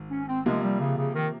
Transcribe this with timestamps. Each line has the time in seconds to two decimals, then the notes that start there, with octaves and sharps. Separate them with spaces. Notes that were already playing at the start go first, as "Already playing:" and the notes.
Already playing: G#1
0.11 C#4
0.28 C4
0.46 C3 F3 G#3 A#3
0.63 G3
0.81 C#3
0.98 C#3
1.15 D#3